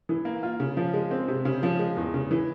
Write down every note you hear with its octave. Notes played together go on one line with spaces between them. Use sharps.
E3
A#3
F4
C#3
F3
G#3
C4
C3
C#3
F3
G#3
E2
C#3
E3